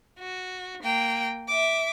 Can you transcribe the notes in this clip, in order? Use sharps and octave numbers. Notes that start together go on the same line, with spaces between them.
F#4
A#3 G5
E5 D6